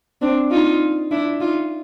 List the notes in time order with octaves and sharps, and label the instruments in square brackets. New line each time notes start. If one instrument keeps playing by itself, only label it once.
[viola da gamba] C4 D4
D#4 F4
D4 E4
D#4 F4